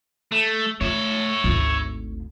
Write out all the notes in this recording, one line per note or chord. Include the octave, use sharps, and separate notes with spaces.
A3
A3 C#5 E5
G#1 D2